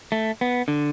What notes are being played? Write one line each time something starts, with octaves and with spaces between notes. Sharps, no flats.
A3
B3
D3